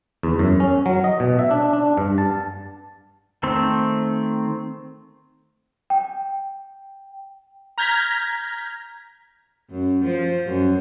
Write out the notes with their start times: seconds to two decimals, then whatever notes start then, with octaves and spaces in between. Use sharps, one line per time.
0.23 E2
0.39 F#2
0.60 C#4
0.86 F#3
1.04 D#5
1.20 B2
1.39 E5
1.51 D4
1.73 D4
1.98 G2
2.18 A5
3.43 D#3 A3 C4
5.90 G5
7.78 A#5 F6 G6 G#6 A#6 B6
9.70 F#2
10.04 F3
10.46 F#2